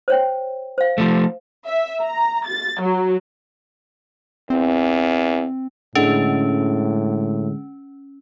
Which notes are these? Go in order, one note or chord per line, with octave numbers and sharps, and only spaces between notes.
C5 C#5 G5
C5 F5
F3 A3
E5
A#5
A6
F#3
E2 C4
A2 D3 G#3 C#4 G#4